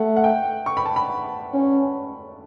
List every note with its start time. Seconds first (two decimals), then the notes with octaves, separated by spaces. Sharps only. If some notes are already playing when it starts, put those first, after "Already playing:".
Already playing: A3 F#5
0.17 F#5
0.24 G5
0.66 C#6
0.77 B5
0.86 A5
0.96 B5
1.54 C#4